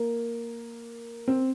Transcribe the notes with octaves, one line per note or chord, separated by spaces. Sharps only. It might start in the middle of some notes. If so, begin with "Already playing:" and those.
Already playing: A#3
C4